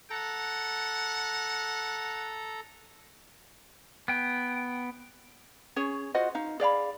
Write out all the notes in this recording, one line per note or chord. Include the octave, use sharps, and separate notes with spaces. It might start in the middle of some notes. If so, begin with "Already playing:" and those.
A4 F#5 A#5
B3 G5
C#4 G#4 C#5
F4 F#4 C5 D#5
D#4 F5
G#4 D5 F5 B5